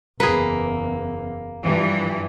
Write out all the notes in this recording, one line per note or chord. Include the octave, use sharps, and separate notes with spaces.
F#1 E2 A#3 G#4 B4
G2 E3 F3